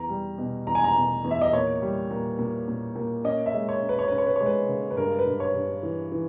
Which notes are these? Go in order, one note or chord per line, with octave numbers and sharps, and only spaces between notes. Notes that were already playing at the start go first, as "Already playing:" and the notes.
Already playing: E2 A#5
G3
B2
E2 A#5
G#5
A#5
B2
E2
E5
D#5
A#2 C#5
G3
A#2
A#2
A#2
A#2
C#4 D#5
E5
G#3
C#5
C#4
B4
C#5
C#4 B4
C#5
B4
C#5
G#3
B4
C#3
B4
G2 A#4
B4
G2
C#5
G2
E3
E3